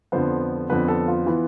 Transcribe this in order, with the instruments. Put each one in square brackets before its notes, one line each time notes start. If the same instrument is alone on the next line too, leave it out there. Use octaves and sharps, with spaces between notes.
[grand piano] F2 D3 F3 B3 C5
F2 D3 F3 B3 B4
A4
F4
E3 B3